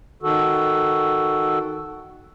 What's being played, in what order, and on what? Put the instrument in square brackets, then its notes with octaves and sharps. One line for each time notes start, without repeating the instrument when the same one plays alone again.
[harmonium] D#3 F#4 A4